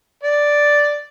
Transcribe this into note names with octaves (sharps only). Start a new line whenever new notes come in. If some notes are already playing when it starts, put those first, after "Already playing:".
D5